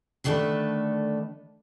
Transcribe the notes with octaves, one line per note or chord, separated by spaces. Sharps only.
D3 D#3 A3 D4 A4 B4